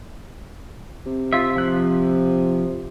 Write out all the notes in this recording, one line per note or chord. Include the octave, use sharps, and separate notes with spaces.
C3
F4 E5
F3 F#6